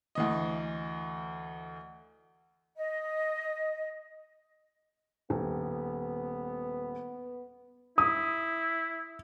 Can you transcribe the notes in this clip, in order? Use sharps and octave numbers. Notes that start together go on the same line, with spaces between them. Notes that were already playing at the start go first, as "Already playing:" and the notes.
D2 E3 D#5
D#5
D#1 B3
E4 D#6